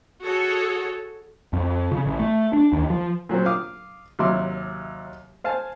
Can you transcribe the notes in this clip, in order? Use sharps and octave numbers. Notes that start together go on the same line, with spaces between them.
F#4 G#4 A4 C#5
F2
C#3
A1
A3
D4
D#2
F3
A#2 F#3 A#3 C4
F5 D6 D#6
D#2 C3 F#3 E5 C6 D6
C5 F5 G#5 A5